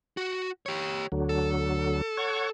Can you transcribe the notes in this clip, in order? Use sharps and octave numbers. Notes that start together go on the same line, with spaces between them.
F#4
G4 C#5
D2 D3 F#3
A4
C#5 F#5 C#6